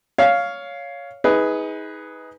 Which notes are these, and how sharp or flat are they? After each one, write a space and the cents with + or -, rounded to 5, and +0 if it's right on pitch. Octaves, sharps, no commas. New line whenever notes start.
C#5 +15 F5 +0
D#4 +35 G#4 +0 B4 +5